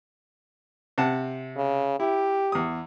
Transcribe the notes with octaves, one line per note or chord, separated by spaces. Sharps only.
C3 F#5 A5
C#3
E4 G4
E2 D#6